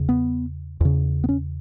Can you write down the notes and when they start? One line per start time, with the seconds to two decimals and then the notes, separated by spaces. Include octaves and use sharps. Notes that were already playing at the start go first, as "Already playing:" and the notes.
Already playing: E2 C#3
0.09 B3
0.81 E2 C#3
1.24 B3
1.29 C#4